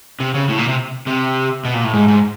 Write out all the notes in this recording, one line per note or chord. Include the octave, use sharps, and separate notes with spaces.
C3
C#3
A2
A#2
C3
C3
B2
A#2
A2
G#2
G#2